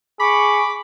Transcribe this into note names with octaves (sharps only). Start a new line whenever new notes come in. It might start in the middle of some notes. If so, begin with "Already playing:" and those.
G#4 B5 C#6 D6